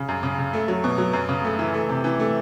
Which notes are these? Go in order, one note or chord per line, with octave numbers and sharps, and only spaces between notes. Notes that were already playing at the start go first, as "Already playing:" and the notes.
Already playing: C#3
F#2
C#3
C#3
A3
F#3
B2
F#3
F#2
C#3
A3
E3
A3
C3
E3
A3